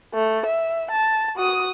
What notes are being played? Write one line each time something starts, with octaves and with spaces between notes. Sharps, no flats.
A3
E5
A5
F#4 D#6